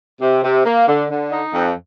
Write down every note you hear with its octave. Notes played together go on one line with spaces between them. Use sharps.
C3
C3
A#3
D3
D3
D#4
F2